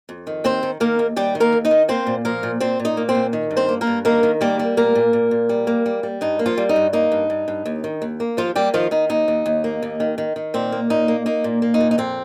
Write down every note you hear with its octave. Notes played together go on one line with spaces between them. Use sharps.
F2
D#3
D#2 C4 C5
D#3
D#3 A#3 A#4
D#2
D#2 G3 G4
D#3
A#3 A#4
D#2
D#4 D#5
D#3
A#3 C4 C5
A#2
F3 A#3 A#4
A#2
A#2 C4 C5
A#2
D#4 D#5
A#3
C4 C5
A#2
D#3
G2
C4 C5
A#3
A#3 A#4
G2
D#3 A#3 A#4
D#3
G3 A#3 G4
G3
A#2 A#3 A#4
A#2
A#2
A#2
G3
A#3
G3
G3
G2 D#4
A#3
F3 F4
G3
D#4
G2
A#3 D#4
G2
G2
G2
D#2
D#3
D#2
A#3
D#2 F3 F4
G3 A#3 G4
D#3 F3 F4
D#3 D#4
D#2 D#4
D#2
D#2
A#3
D#2
D#3
D#3
D#3
A#2 C4
A#3
A#2 D#4
A#3
A#3 D#4
A#2
A#3
D#4
A#2
D#4
F2 C4